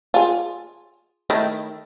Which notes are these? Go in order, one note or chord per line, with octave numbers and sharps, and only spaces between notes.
F4 G#4
D#3 A3 E4